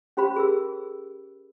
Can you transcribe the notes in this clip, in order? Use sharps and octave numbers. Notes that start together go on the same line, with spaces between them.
C#4 G4 C5 B5
G#4 A#4 E6